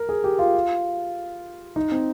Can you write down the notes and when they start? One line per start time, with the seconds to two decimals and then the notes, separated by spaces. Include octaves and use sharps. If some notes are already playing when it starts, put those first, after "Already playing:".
Already playing: A#4
0.09 G#4
0.24 G4
0.39 F4
1.76 D#4
1.92 C4